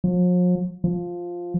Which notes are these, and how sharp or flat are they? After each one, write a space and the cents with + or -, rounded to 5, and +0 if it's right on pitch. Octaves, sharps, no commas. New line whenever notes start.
F3 +45
F3 +5